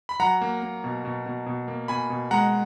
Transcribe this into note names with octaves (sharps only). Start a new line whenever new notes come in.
B5
F#3 F#5 A#5
A#3
A#3
B2
B2
B2
B2
A#3
B2 G#5 B5
B2
G#3 F#5 A#5